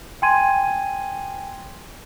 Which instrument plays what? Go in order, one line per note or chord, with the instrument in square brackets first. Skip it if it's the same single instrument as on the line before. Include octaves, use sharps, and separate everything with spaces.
[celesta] G5 G#5 C6 G#6 D#7